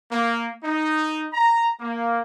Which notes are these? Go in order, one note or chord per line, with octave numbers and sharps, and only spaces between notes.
A#3
D#4
A#5
A#3